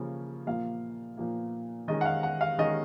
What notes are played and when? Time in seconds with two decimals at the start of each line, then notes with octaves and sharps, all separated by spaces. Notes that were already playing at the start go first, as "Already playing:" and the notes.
Already playing: C#3 F3 A#3 C#4
0.47 A#2 F3 A#3 F5
1.17 A#2 F3 A#3
1.88 D#3 G#3 C#4 D#5
2.01 F#5
2.05 F5
2.23 F#5
2.41 F5
2.58 D#3 G#3 C#4 D#5